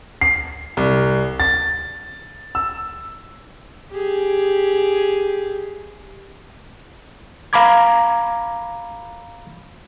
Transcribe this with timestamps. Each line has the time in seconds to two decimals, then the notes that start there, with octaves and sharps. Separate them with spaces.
0.21 C7
0.77 C2
1.40 A6
2.55 E6
3.91 G4 G#4
7.53 F5 A#5 B5 D6 G#6